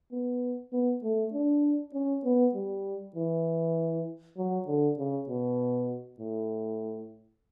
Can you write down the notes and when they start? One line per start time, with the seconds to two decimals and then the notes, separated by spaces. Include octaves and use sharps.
0.12 B3
0.73 B3
1.03 A3
1.33 D4
1.94 C#4
2.24 B3
2.54 G3
3.15 E3
4.37 F#3
4.67 D3
4.98 C#3
5.29 B2
6.19 A2